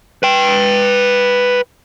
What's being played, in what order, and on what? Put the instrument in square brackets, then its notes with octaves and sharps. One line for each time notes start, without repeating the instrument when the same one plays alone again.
[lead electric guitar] B4 G5